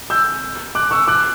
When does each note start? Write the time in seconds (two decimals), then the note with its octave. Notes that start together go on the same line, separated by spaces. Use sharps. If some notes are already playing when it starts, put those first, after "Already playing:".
0.10 E6 G6
0.75 D6 F#6
0.91 C#6 E6
1.08 D6 F#6